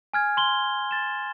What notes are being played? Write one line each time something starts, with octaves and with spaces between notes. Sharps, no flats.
G#5 F6 G#6
C6 G7
A6 E7